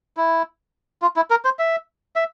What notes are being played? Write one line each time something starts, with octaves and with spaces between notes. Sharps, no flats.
E4
F4
E4
A#4
C5
E5
E5